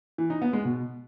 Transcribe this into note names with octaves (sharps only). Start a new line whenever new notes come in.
E3
D#4
B3
G#3
B2